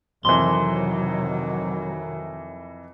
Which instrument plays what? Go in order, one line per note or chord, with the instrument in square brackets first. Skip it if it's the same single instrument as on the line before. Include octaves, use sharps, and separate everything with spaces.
[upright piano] F2 E3 [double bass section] C3 D#3 F#3 [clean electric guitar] C6